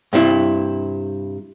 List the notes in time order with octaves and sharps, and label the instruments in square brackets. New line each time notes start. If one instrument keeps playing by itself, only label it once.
[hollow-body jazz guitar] G2 C3 E4